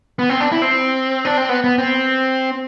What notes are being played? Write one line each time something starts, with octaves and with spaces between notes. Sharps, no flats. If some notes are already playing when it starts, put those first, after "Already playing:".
B3
C4
D4
E4
C4
D4
C4
B3
B3
C4